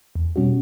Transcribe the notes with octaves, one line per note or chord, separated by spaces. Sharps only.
E2
B2 G3 C#4 F#4